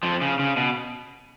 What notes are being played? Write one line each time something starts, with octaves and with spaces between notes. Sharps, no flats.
F2 F3
C#3
C#3
B2